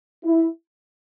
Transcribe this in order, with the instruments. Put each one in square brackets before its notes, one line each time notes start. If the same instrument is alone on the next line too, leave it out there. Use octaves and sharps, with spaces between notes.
[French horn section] E4